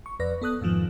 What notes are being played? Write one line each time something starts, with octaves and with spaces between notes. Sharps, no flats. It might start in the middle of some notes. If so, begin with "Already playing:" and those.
C#6
F2 B4 D5 A#6
B3 A4 D#6 F#6
F2 G#2 D#3 F3